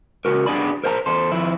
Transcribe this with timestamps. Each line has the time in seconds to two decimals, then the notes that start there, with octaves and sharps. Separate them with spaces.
0.25 C#2 F#4 A#4
0.46 B3 D4 G4 G#4 D5 B5
0.84 A#4 C5 E5 G5 A5 A#5
1.06 E2 A4 C5
1.32 F2 F3 E4